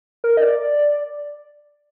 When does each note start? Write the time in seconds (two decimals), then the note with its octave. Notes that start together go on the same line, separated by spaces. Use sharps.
0.24 A#4
0.37 D#5
0.42 D5